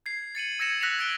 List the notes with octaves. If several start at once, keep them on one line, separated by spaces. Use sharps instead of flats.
G#6 C7
A6 C#7 D#7 F#7
E6 G#6 A#6 C#7 E7 F#7
E6 F#6 A#6 B6 C#7 F7
E6 G#6 D7 F#7 G7